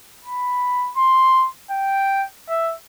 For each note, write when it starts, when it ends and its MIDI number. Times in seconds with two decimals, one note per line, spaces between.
0.25 0.91 83
0.97 1.47 84
1.71 2.25 79
2.49 2.74 76